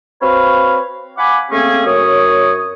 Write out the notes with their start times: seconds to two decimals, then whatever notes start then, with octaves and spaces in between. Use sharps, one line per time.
0.22 C4 F#4 B4 C#5 F5 B5
1.17 F5 F#5 G#5 B5 D6
1.51 A3 A#3 C4 C#4 G#4
1.86 F#2 F#4 C#5 D#6